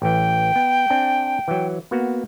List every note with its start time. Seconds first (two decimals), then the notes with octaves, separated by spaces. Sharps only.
0.02 A1 E3 G5
0.56 B3
0.90 C4 D4 G#5
1.48 E3 F#3
1.91 A#3 B3 F#4